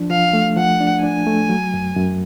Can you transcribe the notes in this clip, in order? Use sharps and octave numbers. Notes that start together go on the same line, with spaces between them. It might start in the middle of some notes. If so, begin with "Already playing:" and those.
Already playing: F3 D4
F3 F5
A3
F3 F#5
D4
D4 G#5
A3
F#3
F#2
F#2